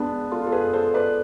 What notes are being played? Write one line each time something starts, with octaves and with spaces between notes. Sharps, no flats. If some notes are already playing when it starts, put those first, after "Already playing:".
Already playing: G#3 B3 D4
F4 A4
A4
G#4 B4
A4 C5
B4 D5